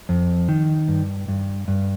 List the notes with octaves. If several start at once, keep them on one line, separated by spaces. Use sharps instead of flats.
F2
D#3
G2
G2
G2